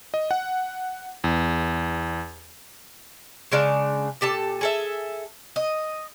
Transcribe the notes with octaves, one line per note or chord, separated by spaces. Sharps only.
D#5
F#5
E2
C#3 G#3 D4 F5
A#2 G4 A4 A5
G#4 A4 E5
D#5